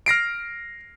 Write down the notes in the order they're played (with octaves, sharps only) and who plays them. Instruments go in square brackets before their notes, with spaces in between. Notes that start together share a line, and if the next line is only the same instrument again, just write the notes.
[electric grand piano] F6 A#6 C7 D7